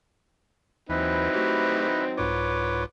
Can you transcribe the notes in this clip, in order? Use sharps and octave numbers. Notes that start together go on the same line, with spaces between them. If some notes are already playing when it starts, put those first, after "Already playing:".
D#2 E3 F#3 C4 D#4 E4 B4
A3 F#4 G4
C2 G#2 F4 B4 C#5 D6